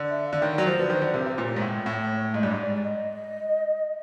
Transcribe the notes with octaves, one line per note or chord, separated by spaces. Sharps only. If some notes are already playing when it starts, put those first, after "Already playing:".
Already playing: D3
E5
F5
D3
D#3 C#5
F#3 D5
F3 C5
D3 B4
D#3 C5
D3
C3 A#4
B4
C3 C5
A#2 C#5
G#2
A2
A2
G#2 D#5
G2 D5
G#2 C#5
D5
D5
D#5